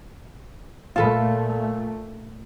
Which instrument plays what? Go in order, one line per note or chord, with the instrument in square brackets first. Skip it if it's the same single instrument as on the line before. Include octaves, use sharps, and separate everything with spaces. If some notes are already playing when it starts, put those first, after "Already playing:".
[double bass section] A#2 A3 [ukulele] F4 A4 B4